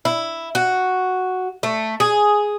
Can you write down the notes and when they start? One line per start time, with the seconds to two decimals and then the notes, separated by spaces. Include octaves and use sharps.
0.05 E4
0.55 F#4
1.63 A3
2.00 G#4